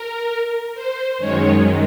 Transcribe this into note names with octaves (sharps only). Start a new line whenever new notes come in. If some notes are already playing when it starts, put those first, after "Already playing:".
Already playing: A#4
C5
F#2 D#3 G#3 C#5